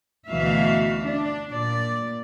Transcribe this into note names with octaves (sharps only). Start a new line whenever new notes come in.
D2 B2 E3 F#4 E5 F5
D4
A#2 D5